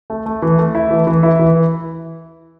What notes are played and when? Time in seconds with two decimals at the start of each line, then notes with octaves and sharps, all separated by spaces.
0.10 A3
0.26 A3
0.42 E3
0.58 A3
0.75 E4
0.91 E3
1.07 E3
1.23 E4
1.39 E3